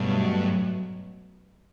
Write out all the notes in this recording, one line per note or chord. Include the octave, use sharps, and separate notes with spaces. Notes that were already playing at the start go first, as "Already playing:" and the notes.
Already playing: G2 B2 F#3 A3